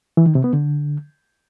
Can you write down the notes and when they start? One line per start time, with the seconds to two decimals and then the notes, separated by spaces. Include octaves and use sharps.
0.17 E3
0.26 D#3
0.35 C3
0.44 B3
0.53 D3